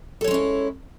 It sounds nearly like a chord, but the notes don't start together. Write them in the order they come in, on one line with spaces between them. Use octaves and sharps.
A4 C#5 G#3 C#4 E4